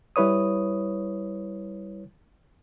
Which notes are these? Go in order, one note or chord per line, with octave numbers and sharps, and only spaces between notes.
G3 E4 B4 C#5 D#6